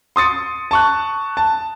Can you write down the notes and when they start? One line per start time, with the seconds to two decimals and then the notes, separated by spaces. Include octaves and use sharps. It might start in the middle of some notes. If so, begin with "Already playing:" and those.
0.16 C6 D#6 A6 C#7
0.71 A5 C#6 F#6
1.37 A5